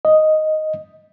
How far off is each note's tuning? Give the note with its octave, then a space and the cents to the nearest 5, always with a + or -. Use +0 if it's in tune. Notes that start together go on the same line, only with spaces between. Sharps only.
D#5 +0